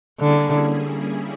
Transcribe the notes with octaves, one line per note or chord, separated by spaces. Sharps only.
D3 G3 A#3 C#4 E4 G#4